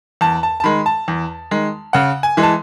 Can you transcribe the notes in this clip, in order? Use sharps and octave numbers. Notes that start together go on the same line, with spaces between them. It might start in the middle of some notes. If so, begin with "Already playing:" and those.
E2 A5
A5
A5
D#3 G#3 B5
A5
E2
D#3 G#3
C#3 F#5
G#5
E3 G#3
A5